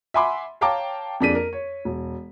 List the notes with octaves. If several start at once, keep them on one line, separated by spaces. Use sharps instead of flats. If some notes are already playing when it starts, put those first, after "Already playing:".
E5 F#5 G#5 B5 C6 D6
C#5 F5 G5 A5 A#5 D6
F2 A#3 D4 G#4 B6 D#7
A#4
C#5
E1